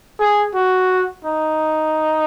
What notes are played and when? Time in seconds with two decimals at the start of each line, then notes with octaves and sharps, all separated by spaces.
0.19 G#4
0.55 F#4
1.25 D#4